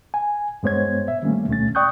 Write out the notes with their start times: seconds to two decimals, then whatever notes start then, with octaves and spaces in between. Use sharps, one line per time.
0.14 G#5
0.63 G2 G#3 B3 C5 C#5 G#6
1.08 E5
1.22 D#3 G3 A3 A#3 C#4
1.48 D2 B2 A3 C#4 A6
1.75 D5 G5 C#6 D#6 F#6 G6